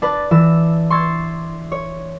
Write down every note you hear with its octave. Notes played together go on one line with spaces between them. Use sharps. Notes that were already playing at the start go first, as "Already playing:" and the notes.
D4 B4 A6
E3 E6
C6 C#6 E6 G#6 A6
C#5